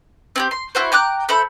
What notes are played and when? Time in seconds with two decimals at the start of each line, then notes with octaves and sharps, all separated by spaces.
0.36 C4 E4 G4
0.51 C6
0.75 E4 F#4 C5
0.92 G5 A#5 D6 F#6
1.29 A4 C5 E5 B5